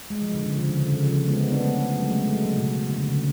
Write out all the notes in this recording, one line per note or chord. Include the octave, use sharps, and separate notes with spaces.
G#3
F3
D3
C#3
F3
D3
C#3
D3
C#3
F3
F3
G#3 B3
B3 D4
A3 C#4
F#3
G#3
A3
G#3
F#3
C#3
B2
D3
C#3
D3